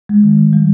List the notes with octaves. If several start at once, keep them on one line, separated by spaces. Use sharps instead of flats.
G#3
D#3
D#3
G3